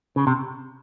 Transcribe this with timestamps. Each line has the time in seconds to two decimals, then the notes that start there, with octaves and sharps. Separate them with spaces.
0.16 C#3
0.27 C3